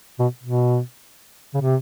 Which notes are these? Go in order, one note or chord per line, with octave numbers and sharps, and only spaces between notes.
B2
B2
C#3
C3